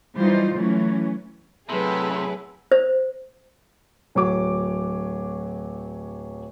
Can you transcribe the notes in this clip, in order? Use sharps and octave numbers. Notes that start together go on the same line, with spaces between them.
E3 F#3 G3 D#4 F4 C5
E3 F#3 A3 C#4
A2 C3 F#3 E4 G#4 A4 B4
C5
D1 F#3 C#5 D6